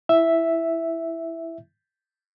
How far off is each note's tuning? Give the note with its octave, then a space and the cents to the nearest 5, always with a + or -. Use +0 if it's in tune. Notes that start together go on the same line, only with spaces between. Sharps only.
E4 +5 E5 +0